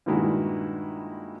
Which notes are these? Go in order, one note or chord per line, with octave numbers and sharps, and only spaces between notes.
G2 A#2 D#3 G#3 E4 F#4